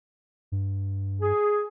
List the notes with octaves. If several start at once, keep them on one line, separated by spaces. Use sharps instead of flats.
G2
G#4